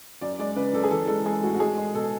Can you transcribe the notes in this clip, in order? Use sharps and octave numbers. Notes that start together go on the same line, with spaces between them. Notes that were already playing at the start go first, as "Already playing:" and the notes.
F#2 D5
G#3 D5
C#3 B4
F#2 A4
G#4
E3 A4
G#3 A4
G#3 G#4
A2 F#4
F#4
G#3 G#4
G#3
B2 A4